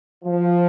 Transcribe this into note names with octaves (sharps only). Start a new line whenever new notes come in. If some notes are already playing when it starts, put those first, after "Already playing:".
F3